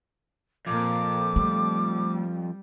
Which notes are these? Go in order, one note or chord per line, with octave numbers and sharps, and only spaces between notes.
F2 A#2 A#3 D6
G3 A3